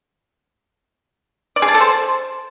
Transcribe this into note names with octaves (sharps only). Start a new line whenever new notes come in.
D5
G#4
A5
A4
C5